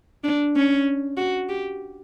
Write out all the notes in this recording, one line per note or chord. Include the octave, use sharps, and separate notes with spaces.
D4
C#4
F#4
G4